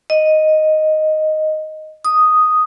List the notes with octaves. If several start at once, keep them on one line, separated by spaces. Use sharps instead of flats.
D#5
D#6